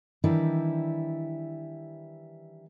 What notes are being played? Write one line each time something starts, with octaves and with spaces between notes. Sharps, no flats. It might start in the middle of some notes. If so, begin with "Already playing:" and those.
D#3 E3 G3 D4 E4 B4